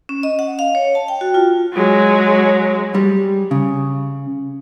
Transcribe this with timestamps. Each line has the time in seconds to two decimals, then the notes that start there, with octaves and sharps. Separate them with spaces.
0.09 C#4
0.23 D#5
0.39 F#5
0.59 F5
0.75 C#5
0.95 A5
1.08 G5
1.21 F#4
1.34 F4
1.74 F#3 G#3
2.94 G3
3.51 C#3